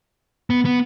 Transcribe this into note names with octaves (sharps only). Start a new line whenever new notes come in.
B3
B3